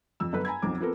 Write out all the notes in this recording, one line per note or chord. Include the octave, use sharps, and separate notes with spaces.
F2 E6
G1 F#2 A4 B4
G#5 A#5 B5 G#6
B1 F2 C4 D6
F3 B3 C4 A4 A#4